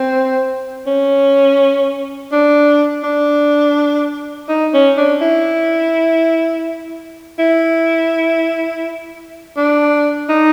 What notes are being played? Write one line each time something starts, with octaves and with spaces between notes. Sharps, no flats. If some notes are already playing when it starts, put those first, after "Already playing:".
Already playing: C4
C#4
D4
D4
D#4
C#4
D4
E4
E4
D4
D#4